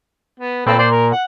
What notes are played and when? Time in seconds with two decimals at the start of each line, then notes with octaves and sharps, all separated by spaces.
0.40 B3
0.66 A#2 C4 A4 B4
0.79 C5 D5
0.91 A#4
1.12 F#5